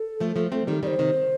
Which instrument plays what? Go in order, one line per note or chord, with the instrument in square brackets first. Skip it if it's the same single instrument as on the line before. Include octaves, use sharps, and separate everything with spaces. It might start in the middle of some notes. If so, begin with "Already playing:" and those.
Already playing: [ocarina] A4
[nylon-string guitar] F3 A3
F3 A3
A3 C4
D#3 G3
[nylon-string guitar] D#3 G3 [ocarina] D5
[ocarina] C5
[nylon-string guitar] C3 D#3